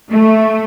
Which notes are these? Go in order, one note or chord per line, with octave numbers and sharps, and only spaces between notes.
A3